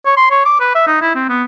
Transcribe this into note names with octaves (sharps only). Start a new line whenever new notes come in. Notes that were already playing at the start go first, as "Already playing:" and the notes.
C#5
C6
C#5
D6
B4
E5
D#4
E4
C4
B3